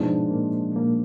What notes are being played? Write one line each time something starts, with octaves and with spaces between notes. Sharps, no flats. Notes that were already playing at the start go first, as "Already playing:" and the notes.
Already playing: G#2 B2 F3 G#3 B3 D4
A#2 A#3
A#2 A#3